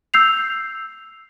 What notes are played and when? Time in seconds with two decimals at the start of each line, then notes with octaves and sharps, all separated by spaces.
0.14 E6 G6 C7 F7